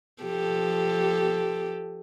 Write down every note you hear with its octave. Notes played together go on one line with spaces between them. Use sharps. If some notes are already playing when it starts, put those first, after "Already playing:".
F3 G4 A4